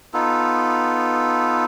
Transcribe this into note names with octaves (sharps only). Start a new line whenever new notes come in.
B3 D#4 F4 A4